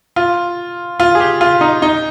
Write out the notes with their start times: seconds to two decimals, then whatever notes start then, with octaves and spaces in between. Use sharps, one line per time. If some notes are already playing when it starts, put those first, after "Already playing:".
0.16 F4
1.00 F4
1.15 G#4
1.20 G4
1.41 F4
1.61 D#4
1.82 D#4